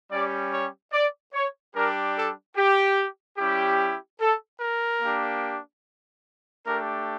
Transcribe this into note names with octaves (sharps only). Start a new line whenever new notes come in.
G3 C#4 G4 D5
C#5
D5
C#5
G3 D4 G4 A#4
A4
G4
G3 C#4 E4 G4
A4
A#4
A#3 D4 G4
A3 D4 G4 A#4